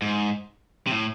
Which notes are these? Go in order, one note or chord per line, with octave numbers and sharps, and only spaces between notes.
G#2
C3
A2